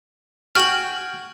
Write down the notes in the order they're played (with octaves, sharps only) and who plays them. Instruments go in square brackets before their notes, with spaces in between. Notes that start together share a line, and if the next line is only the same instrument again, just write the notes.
[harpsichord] F#4 G5 G#5 [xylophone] F6 F#7